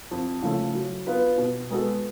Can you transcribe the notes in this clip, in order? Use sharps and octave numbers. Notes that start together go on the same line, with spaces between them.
F2
C#3 F3 A3
F#3
B3 F4 B4
B2
G#3 B3 F#4 A4